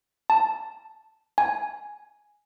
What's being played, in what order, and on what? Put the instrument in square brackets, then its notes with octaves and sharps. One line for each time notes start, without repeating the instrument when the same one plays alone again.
[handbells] A5
G#5